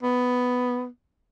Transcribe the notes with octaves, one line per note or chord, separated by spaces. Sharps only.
B3